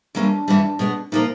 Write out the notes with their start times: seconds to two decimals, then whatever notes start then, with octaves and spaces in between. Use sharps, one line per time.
0.15 E3 G3 A#3 C#4 D4
0.48 G2 E3 G3 B3
0.79 B2 G#3 B3
1.12 A#2 F3 A#3 D#4